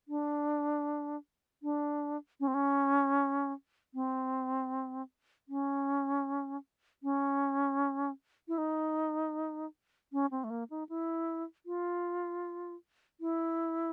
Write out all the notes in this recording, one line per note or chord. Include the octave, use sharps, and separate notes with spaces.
D4
D4
C#4
C4
C#4
C4
C#4
C#4
E4
D#4
C#4
C4
A3
A#3
D#4
E4
F4
E4